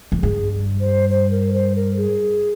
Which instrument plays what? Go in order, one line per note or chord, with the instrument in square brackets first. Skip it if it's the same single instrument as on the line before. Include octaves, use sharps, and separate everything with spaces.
[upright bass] F2
[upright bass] G2 [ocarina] G#4
[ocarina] C5
C5
A#4
C5
A#4
G#4